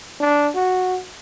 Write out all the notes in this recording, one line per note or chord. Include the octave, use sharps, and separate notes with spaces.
D4
F#4